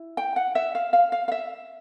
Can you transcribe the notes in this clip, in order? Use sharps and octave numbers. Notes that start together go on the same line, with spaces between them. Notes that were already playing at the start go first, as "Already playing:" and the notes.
Already playing: E4
G5
F#5
E5
F5
F5
F5
F5
E5